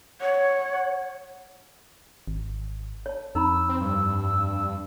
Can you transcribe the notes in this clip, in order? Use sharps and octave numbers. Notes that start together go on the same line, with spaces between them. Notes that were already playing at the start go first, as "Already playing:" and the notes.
C#5 F#5
G#1
C#5 A5
F2 D#4 A#5 B5 E6
C4
G2